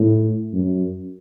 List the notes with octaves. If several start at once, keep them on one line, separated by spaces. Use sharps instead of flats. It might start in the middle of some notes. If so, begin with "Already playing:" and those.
Already playing: A2
F#2